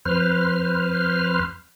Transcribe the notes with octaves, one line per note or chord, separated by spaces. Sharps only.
F2 B4 C5 F6